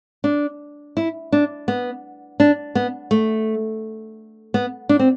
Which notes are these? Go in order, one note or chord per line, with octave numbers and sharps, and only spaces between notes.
D4
E4
D4
B3
D4
B3
A3
B3
D4
C4